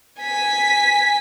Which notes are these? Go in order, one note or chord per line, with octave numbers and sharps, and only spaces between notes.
G#5 B6